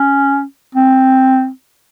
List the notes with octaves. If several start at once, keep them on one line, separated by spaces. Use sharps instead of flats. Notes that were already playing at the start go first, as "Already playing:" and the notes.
Already playing: C#4
C4